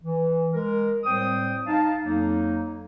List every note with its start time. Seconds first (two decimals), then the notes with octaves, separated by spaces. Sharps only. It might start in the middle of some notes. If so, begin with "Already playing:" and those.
0.02 E3
0.53 G#3 A#4
1.04 A2 G3 C4 C5 G5 D#6
1.66 D#4 F5 A5
2.04 F2 F#3 A#3 D#4